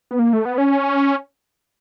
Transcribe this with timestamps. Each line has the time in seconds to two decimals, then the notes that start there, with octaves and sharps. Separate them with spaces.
0.11 B3
0.19 A#3
0.33 A3
0.45 B3
0.58 C#4